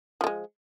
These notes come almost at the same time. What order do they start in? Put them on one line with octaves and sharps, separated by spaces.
F3 A3 G#3